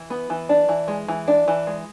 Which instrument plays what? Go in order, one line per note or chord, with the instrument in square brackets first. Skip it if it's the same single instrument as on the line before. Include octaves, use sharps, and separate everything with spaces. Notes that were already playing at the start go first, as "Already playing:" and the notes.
Already playing: [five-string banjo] E3
B3
E3
D4
E3
G#3
E3
D4
E3
G#3